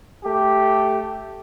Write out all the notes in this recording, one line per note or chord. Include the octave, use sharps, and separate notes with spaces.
A3 G4